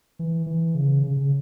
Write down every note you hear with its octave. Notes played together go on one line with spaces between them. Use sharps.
E3
E3
C#3
C#3
C#3